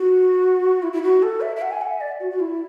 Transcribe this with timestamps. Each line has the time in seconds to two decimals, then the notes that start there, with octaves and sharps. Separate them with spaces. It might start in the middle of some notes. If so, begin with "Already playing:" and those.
Already playing: F#4
0.83 E4
0.93 E4
1.03 F#4
1.23 A4
1.41 E5
1.56 E5
1.62 F#5
1.71 G#5
1.81 F#5
1.91 E5
2.01 D5
2.20 F#4
2.31 F#4
2.40 E4